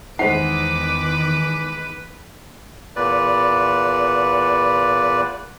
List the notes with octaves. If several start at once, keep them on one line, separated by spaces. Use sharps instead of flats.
E2 D#3 G#3 D#4 B4 C5 F#5 D6
E2 A#2 B4 D5